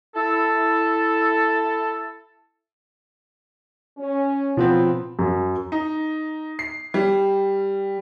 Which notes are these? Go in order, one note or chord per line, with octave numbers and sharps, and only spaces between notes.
E4 A4
C#4
B2 F3 F#3 A3 B3 C4 F4 A4
F#2
D#4
C7
G3